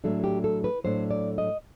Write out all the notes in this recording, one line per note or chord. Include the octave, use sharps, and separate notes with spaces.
A2 F#3 A3 D4 A4
G4
A4
B4
A2 F#3 A3 D4 C5
D5
D#5